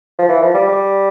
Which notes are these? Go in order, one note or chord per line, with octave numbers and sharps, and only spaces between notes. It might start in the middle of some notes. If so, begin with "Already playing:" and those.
F3
E3
F3
G3
G3